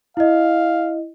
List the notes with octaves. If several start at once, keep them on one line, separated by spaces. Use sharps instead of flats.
E4 D#5 F5